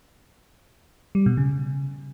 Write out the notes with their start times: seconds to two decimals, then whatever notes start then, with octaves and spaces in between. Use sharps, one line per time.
1.15 G3
1.26 B2
1.37 C#3